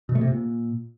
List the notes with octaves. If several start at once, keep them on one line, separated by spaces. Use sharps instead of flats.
B2
A3
C3
A#2